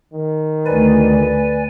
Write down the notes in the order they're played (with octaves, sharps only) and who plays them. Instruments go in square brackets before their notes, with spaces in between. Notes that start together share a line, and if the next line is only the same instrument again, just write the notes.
[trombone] D#3
[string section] D2 [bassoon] B4 [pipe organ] D5 G#5